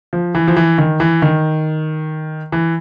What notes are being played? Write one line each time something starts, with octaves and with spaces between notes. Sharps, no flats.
F3
E3
F3
E3
D#3
E3
D#3
E3